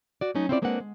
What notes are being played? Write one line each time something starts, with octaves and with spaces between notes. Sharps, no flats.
F#4 D5
F#3 A3 C#4 D#4
C4 C#4 E4 F4 C5 D5
G#3 A#3 C4 D4 B4 F#5
G#3